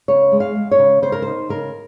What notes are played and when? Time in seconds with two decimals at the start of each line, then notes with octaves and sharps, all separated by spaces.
0.08 C#3 C#5
0.32 G#3
0.40 F5
0.55 G#3
0.71 C#5
0.79 C#3
1.02 C#3 C5
1.12 A#4
1.22 D#4 C5
1.49 C#3 A#4